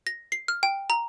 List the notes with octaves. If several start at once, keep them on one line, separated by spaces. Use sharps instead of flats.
A#6
C7
F6
G5
A#5